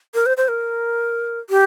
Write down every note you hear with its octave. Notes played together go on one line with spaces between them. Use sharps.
A#4
C5
C5
A#4
G4